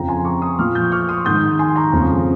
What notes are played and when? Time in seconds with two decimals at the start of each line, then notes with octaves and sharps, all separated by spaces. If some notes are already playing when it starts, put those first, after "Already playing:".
Already playing: F2 C#3 F3 G5 A#5
0.08 G#5 C6
0.25 A#5 C#6
0.42 C6 D#6
0.59 A#2 F3 C#6 F6
0.75 D#6 G6
0.92 C#6 F6
1.09 C6 D#6
1.25 G#2 D#3 D#6 G6
1.59 G#5 C6
1.76 A#5 C#6
1.93 F2 C#3 F3